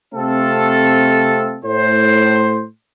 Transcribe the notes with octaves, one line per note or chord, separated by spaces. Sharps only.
C3 A3 C4 F4 A4
A2 C5